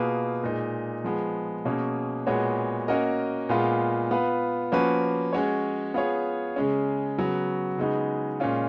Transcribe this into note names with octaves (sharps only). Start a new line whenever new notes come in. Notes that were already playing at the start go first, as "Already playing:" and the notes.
Already playing: B2 A#3 F4 G#4 B4
A#2 G#3 D#4
F3 G#3 B3
B2 A#3 C#4 G#4
A#2 G#3 B3 F#4 C#5
A#3 C#4 F#4 A#4 D#5
A#2 G#3 B3 F4
B3 F4 B4
F3 A#3 C#4 F#4 B4
G#3 C#4 F#4 C#5
B3 F4 G#4 C#5
C#3 G#3 C#4
C#3 F#3 B3 F#4
C#3 G#3 B3 D#4 F#4
A#2 G#3 C#4 F4